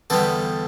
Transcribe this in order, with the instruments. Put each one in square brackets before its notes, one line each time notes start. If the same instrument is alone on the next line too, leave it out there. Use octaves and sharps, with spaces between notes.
[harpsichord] E2 D3 G3 B3 A4